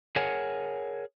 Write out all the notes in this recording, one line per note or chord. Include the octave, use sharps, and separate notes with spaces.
G#4 A#4 C#5 F#5 G#5